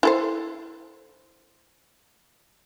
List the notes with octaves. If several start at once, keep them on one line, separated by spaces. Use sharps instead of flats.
E4 A4 C5